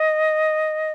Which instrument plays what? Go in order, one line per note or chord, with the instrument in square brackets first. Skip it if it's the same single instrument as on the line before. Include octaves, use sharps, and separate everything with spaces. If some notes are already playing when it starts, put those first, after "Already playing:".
Already playing: [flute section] D#5